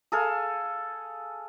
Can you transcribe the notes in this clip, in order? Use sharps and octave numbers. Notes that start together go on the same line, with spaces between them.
G#4 A4 F5